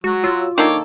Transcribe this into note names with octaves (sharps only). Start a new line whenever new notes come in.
F#3 G#3 F#4
F4 F#4 C#5 E6
D#3 A#3 D4 D#4 A4 C#5 D6